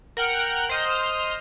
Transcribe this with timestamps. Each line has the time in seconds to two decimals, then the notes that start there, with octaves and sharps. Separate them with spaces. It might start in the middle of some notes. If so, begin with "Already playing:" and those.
0.17 A#4 F#5 G5 F6 F#6
0.69 C5 D#5 F6